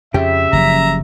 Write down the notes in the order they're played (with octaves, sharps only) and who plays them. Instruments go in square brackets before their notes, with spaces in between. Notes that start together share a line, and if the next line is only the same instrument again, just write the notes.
[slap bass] F2 [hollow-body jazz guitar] C#3 G4 [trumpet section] E5
[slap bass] F#1 F#2 F3 [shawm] A#5